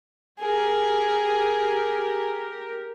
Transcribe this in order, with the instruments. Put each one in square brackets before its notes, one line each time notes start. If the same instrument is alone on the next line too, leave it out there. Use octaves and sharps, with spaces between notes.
[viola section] G4 A#4 [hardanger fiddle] G#4